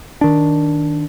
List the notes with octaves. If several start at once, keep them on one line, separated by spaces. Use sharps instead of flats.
D#3 D4